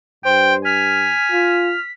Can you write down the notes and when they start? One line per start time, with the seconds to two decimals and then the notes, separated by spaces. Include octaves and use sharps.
0.25 G2 C5 G5
0.65 G#5 F6 B6
1.32 F4